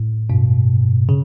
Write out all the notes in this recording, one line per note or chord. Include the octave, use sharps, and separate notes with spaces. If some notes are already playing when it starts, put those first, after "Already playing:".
Already playing: A2
G2 B2
C#3